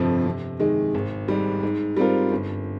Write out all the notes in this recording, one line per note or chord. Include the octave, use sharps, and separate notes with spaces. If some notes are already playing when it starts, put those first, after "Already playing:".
Already playing: G1 F2 C3 F3
C3
D#3 G#3
G#1
G#2 G3
G#2
G3 C4 F4 A#4
G1